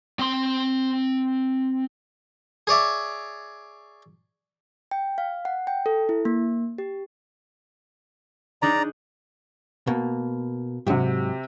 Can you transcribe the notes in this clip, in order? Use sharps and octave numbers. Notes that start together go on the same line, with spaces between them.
C4 C6
G#4 C#5 D5 E5
G5
F5
F#5
G5
A4
E4
A#3
G4
G#3 D4 D#4 D5 A#5
B2 A#3
G#2 C3 F#3 G4